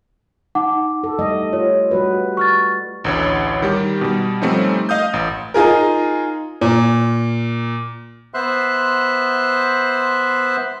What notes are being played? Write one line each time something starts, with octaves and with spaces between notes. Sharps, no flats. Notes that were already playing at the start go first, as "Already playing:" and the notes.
D#4 F#5 D6
A4
G3 A3 D#5
F4 C#5
G3 F#4 B4
C#6 F6 A6
A1 D2 C#5
D#3 G3 G4
B2 G3
F3 G3 A3 C4 C#4 D#4
D#5 F5 D#6 G6
A1
D#4 F4 G#4 A#4
A#2
B3 C5 E5 C6 F#6